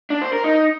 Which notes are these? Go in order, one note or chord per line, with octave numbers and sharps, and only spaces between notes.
D4
C5
A#4
D#4